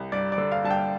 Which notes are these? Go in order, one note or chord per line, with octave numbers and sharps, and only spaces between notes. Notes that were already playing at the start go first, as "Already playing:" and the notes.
Already playing: C2
G2 D5
D5
D3
F5
G2 A5
G5